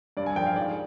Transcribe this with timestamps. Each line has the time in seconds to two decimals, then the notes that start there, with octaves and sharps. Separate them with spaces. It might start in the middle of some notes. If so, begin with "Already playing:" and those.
0.17 G2 D5
0.26 G#5
0.36 F3 G5
0.46 F5
0.56 G#2 D5